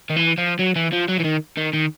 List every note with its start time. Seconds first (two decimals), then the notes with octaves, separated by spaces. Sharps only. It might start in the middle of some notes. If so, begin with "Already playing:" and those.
0.10 D#3
0.16 E3
0.38 F3
0.59 F#3
0.76 E3
0.92 F3
1.08 F#3
1.19 E3
1.24 D#3
1.57 D#3
1.73 D#3